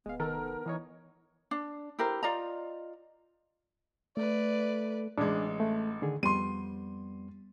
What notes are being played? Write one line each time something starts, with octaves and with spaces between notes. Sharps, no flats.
D1 G#3 B3 F5
F1 D#3 A4 A#4
E3 D#4 C#5
D4
E4 G4 A#4 C5
F4 D5 D#5 A#5
A3 B4 D5
A1 G#3 D4
A3
D3 D#3 G#4
F2 G3 B3 C6 D#7